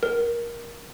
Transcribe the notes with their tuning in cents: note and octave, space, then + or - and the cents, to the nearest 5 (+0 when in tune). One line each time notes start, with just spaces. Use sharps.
A#4 +15